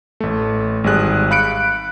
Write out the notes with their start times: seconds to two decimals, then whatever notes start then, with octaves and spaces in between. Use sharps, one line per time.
0.20 A1 A3
0.84 G#1 G3 G#4 F#6
1.31 F5 B5 F#6 C#7 D7